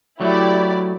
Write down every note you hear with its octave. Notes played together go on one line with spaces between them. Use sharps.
F#3 A3 E4 G4 D5